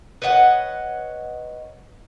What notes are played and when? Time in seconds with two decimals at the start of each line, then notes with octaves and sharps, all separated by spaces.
0.22 B4 C#5 D#5 F#5